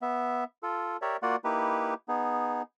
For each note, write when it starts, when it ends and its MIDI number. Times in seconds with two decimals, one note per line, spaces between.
0.02 0.44 59
0.02 0.44 76
0.63 0.97 65
0.63 0.97 69
1.02 1.17 67
1.02 1.17 70
1.02 1.17 73
1.02 1.17 74
1.02 1.17 76
1.22 1.36 58
1.22 1.36 65
1.22 1.36 66
1.22 1.36 74
1.22 1.36 78
1.44 1.94 58
1.44 1.94 63
1.44 1.94 64
1.44 1.94 67
1.44 1.94 71
2.08 2.62 59
2.08 2.62 63
2.08 2.62 68